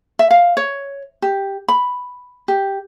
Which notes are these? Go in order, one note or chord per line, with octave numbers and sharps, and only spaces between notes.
E5
F5
C#5
G4
B5
G4